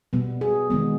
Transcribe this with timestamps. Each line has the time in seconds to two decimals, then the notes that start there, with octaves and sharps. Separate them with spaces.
0.13 B2 G3 B3
0.41 G#4
0.70 D#3 G#3 B3